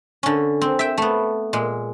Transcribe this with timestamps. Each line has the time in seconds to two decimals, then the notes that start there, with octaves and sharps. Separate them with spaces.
0.23 D3 C#4
0.61 C4
0.79 E5 G5
0.98 A3 B3
1.53 A#2 G#3